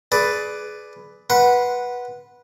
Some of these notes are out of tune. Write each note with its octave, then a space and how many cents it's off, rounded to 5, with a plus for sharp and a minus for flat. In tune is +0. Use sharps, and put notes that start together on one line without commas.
G#4 +25 B4 +5 D5 +0
B4 -15 F#5 +0 C6 -20